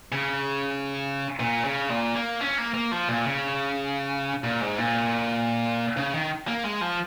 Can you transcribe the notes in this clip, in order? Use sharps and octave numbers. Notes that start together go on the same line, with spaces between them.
C#3
A#2
C#3
A#2
A#3
C#4
A#3
A#3
F3
A#2
C#3
A#2
G#2
A#2
C#3
D#3
A#3
G#3
F3